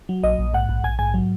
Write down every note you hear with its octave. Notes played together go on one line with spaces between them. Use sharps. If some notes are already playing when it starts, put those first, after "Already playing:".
F#3
A#1 D#5
A#1
G#2 F#5
A#1
A#1 G#5
G#2 G#5
F#3